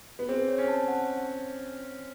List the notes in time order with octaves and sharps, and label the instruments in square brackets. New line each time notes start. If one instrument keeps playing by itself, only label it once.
[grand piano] B3
[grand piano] C4 [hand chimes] G#4
[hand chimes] C#5
[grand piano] C#4
[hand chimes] A5
F#5